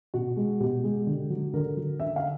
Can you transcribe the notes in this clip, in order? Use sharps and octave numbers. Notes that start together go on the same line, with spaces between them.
B2 F#4
G#3
B2 G4
G#3
D3
F#3
D3 A#4
F#3
D3 E5
F5